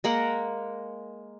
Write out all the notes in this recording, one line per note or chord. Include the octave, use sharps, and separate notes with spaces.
G#3 A#3 A#4 F#5